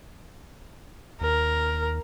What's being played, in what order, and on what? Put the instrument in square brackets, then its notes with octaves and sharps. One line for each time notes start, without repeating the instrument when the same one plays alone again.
[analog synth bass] D#2 [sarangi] A#4